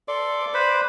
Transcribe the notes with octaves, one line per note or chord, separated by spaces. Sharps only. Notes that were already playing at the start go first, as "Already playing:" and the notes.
A4 D5 C6
B4 C5 B5